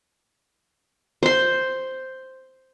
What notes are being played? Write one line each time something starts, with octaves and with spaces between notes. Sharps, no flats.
C5 C6